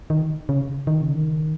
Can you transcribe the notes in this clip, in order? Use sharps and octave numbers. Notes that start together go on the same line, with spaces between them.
D#3
C#3
D#3
C#3
D#3